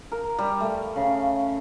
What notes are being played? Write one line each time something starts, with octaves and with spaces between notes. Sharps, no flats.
A#4
G3
A3
C#3